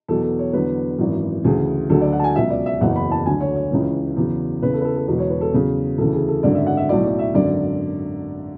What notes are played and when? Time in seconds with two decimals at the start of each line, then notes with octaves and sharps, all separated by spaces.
0.08 E2 B2 F#3 A4
0.23 A4
0.39 C#5
0.53 E2 D3 F#3 B4
0.98 G#1 F#2 E3
1.44 D2 C#3 E3 G#4
1.90 D2 D3 F#3 A4
2.01 D5
2.12 F#5
2.19 A5
2.24 G#5
2.36 C#2 B2 F#3 E5
2.50 D5
2.66 E5
2.81 F#1 E2 C#3 F#3 F#5
2.96 B5
3.11 A5
3.26 D2 D3 F#3 G#5
3.41 C#5
3.56 C#5
3.71 C#2 C#3 E3
4.17 E2 C#3 F#3
4.62 E2 C#3 E3 B4
4.74 A4
4.81 B4
4.85 A4
4.97 A4
5.07 E1 E2 B2 F#3 B4
5.19 C#5
5.30 B4
5.41 A4
5.52 E2 C#3 F#3 G#4
5.98 D2 C#3 E3 A4
6.13 G#4
6.28 A4
6.43 G#1 F#2 D3 F#3 D5
6.55 E5
6.67 F#5
6.77 E5
6.89 B1 A2 F#3 D5
7.05 D5
7.19 E5
7.34 G#1 F#2 D3 F#3 D5